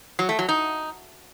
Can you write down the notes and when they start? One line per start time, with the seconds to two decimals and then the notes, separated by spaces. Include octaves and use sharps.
0.19 F#3
0.29 A3
0.39 F#3
0.49 D#4